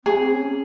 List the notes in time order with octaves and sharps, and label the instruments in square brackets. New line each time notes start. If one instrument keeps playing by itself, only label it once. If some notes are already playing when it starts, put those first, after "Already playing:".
[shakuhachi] C4 [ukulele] G#4
[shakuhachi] C#4